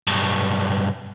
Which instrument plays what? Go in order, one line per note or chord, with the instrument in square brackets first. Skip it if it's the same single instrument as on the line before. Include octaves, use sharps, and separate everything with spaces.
[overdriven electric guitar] B1 G2